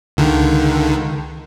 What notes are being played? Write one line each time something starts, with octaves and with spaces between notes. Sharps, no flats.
C#2 D3 D#3